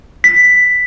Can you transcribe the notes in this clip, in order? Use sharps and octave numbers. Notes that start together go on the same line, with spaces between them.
B6